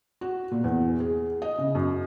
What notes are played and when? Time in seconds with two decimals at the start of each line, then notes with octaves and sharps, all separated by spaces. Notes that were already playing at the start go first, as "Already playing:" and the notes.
0.21 F#4
0.51 A#2
0.64 E2
1.00 G#4
1.42 D#5
1.58 C#3
1.75 F#2